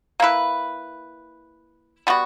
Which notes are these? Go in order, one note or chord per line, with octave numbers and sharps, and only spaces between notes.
A#3 E4 B4
G3 B3 F#4